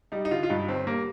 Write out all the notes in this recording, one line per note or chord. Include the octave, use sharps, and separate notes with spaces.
G3 D#4
D#4
D3 F4
F4
G2 D#4
G1 C4
G3 A#3